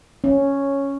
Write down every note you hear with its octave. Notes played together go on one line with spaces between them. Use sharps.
C#4